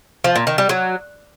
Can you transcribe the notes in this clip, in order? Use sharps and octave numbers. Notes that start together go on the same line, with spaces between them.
F3
A#2
D#3
G3
F#3